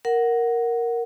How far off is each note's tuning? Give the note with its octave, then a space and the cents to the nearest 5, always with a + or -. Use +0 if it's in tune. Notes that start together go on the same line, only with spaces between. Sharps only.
A#4 +0 F#5 +0